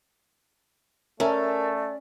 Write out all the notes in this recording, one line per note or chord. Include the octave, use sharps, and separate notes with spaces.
A3 C#4 A#4 D5 E5 A5